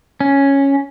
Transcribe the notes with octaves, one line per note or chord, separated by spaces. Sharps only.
C#4